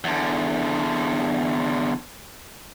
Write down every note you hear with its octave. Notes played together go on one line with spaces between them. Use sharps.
E2 D3